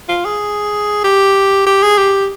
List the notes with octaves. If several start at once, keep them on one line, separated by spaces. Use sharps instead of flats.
F4
G#4
G4
G4
G#4
G4